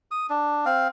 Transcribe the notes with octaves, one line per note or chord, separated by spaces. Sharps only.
D#6
D4
C4 F5